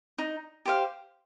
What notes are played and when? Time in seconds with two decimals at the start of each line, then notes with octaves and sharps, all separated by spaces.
0.18 D#4
0.66 G4 C5 F5